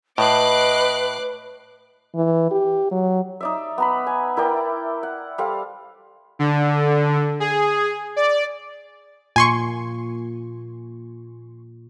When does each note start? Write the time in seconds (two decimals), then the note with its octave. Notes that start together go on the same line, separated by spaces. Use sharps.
0.18 A2 B4 D#5 D6 F#6 C7
2.15 E3
2.51 G4
2.91 F#3
3.41 D#4 D5 E5
3.78 B3 A#5 B5
4.07 G#5
4.37 E4 A#4 D5 G5
5.03 F#5
5.38 G3 A4 C5 F5
6.39 D3
7.40 G#4
8.16 D5
9.36 A#2 G#5 C6 C#6